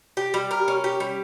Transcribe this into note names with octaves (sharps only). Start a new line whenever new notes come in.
G4
G3
A#4
C#4
G4
G3